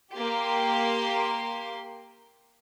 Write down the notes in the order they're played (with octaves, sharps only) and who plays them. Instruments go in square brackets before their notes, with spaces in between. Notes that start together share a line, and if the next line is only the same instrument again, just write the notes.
[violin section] A#3 G4 C6